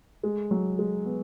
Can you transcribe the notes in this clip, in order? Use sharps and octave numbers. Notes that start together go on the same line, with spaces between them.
G#3
F#3
G#3
B3